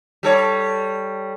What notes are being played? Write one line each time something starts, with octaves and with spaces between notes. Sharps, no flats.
G3 A4 C#5